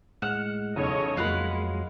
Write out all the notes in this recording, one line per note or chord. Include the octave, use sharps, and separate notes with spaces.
A2 G#3 F#5 F6 E7 F7
B1 E2 C#3 D#4 A4 C#5 D#5 D#6
F2 F#3 G#3 A#3 F4 F5 F#5 B5